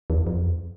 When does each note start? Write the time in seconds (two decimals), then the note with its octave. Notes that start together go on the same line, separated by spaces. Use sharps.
0.10 E2
0.27 F2